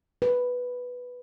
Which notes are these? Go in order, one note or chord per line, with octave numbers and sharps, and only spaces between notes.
B4